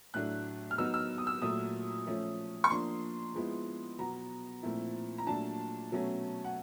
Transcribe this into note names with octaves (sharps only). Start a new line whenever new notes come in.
A2 F#3 A3 D4 F#6
F6
F#3 B3 D#4 E6
E6
D#6
E6
A#2 F#3 A3 D#6
F3 A3 C#4
C#6
F3 A#3 D4 C6
F3 G#3 B3 E4
B2 F#3 B3 A#5
A#2 F3 A3 C4 E4
A#5
A#2 F#3 A3 D4 A5
B2 F#3 A3 C#4
F#5